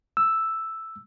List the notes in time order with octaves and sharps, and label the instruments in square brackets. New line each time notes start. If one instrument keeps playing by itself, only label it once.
[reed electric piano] E6